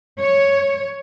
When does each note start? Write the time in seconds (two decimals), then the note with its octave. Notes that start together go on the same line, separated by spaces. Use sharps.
0.21 C#5